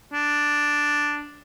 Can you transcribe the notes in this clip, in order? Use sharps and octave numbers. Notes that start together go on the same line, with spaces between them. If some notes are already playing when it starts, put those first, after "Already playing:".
D4